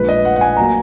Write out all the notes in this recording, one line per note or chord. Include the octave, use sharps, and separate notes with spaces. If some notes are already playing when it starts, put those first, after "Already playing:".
Already playing: A#1 A#2 G#3 B4
D#5
F#5
F#5
G#5
F#3 A#3 A#5